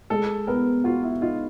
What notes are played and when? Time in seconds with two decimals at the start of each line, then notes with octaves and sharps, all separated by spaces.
0.10 G#3 A4
0.47 B3 A#4
0.84 F4 F#4
1.04 E4
1.21 D#4 F4